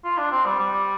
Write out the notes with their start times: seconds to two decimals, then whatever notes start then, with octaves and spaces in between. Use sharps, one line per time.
0.04 F4
0.18 D4
0.31 C4
0.46 G3
0.59 G3